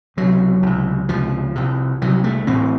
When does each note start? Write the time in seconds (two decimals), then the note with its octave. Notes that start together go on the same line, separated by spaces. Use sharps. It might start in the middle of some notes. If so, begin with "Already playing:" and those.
0.17 C#2 C3 F#3
0.62 C#2 C3
1.09 C#2 C3 F3
1.55 C2 C3
2.02 C2 C3 F#3
2.24 A3
2.47 A1 A2 C4